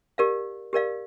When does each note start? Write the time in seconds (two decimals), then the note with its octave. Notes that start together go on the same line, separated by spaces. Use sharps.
0.18 G4 A#4 D5 F5
0.73 G4 A#4 D5 F5